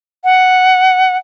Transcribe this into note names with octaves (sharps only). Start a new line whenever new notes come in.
F#5